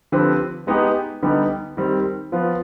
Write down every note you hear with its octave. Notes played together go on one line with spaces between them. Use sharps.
D3 F3 C4 G4 B4
G#3 B3 D#4 G4
D3 G3 B3 D#4 G4
D#3 G3 C4
F3 B3 F4